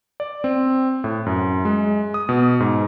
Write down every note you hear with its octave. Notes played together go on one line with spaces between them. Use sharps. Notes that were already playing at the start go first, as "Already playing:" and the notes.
D5
C4
A2
F#2
G#3
D#6
B2
G#2